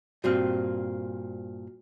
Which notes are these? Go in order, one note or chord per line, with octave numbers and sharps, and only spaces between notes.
G2 A#2 C4 F#4 F6